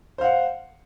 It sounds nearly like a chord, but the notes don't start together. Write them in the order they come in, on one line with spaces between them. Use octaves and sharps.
C5 F5 F#5